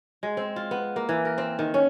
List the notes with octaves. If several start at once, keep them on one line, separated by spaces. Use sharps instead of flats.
G#3
C4
F4
B3
A#3
E3
A#4
C4
D#3
C#4